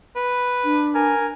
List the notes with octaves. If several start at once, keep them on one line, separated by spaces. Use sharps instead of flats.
B4
D4
A#4 G#5